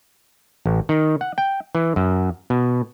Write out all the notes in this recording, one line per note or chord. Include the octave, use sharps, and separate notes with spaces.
A1
D#3
F#5
G5
E3
F#2
B2